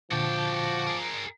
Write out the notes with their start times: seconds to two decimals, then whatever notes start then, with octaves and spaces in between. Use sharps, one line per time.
0.12 A#2 D3 F3 F#4 G5 A5 D6 A6
0.87 G#4 A#4